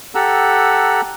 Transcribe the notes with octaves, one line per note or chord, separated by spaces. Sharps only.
G4 A4 F#5 A#5 E6